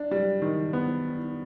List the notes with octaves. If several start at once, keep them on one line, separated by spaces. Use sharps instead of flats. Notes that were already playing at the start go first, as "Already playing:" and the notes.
Already playing: D4
G3
D#3
B3